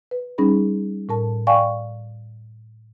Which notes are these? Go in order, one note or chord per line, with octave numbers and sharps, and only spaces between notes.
B4
G3 C#4 D#4 G#4 B5
A2 A#4 A5
D5 F5 G5 G#5 C#6